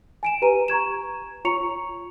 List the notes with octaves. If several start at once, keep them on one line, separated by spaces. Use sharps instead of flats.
G#5 D7 E7
G4 B4 A#5 D#7
A#5 C#6 G#6 E7
F4 C#5 A#5 C#6 C#7 F7